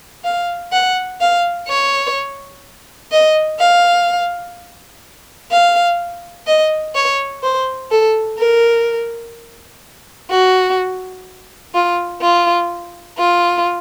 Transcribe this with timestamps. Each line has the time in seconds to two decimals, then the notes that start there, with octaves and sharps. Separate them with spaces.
0.24 F5
0.72 F#5
1.20 F5
1.68 C#5
3.11 D#5
3.59 F5
5.51 F5
6.47 D#5
6.95 C#5
7.43 C5
7.91 A4
8.38 A#4
10.30 F#4
11.74 F4
12.21 F4
13.18 F4